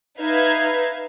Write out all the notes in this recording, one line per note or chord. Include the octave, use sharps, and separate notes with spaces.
D#4 B4 E5 F5 G#6